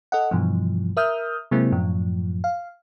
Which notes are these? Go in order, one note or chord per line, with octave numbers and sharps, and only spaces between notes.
A4 D#5 F#5
G2 B2 E3 F3
A#4 E5 D#6 F6 G6
C3 F#3 G#3 A#3 C4 E4
F#2 A2 F3
F5